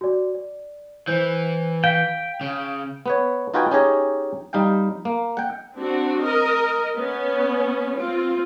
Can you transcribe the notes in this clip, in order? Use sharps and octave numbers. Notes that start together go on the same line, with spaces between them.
F#4 D5
D5
E3 C5 G6
F5 G5 B6
C#3
B3 B4 C#5
D#4 F4 F#4 B4 G5 G#5
C#4 D#4 G4 G#4 C#5 D#5
G3 D#4 F5 G5
A#3
F#5 G5
C4 D4 F#4
A#4 D#5
B3 C#4
C4 F4